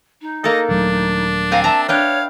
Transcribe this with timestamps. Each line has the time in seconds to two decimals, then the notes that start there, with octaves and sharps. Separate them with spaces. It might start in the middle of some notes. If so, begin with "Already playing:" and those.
0.21 D#4
0.44 A#3 A4 D#5
0.69 D#1 F#3 A3 D4
1.51 C4 F5 G#5 A#5
1.64 E5 A5 A#5
1.88 D4 B4 C#5 F5 G5